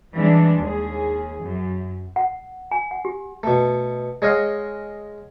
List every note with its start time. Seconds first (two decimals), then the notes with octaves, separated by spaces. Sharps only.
0.14 E3 G3 G#3 D4
0.60 D#2 G#4
1.42 F#2
2.16 F#5
2.72 G#5
2.91 F#5
3.05 G4
3.43 B2 A3
4.22 G#3 C#5 D#5 F5 F#5